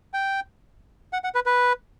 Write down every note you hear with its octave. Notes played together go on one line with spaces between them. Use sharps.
G5
F#5
F#5
B4
B4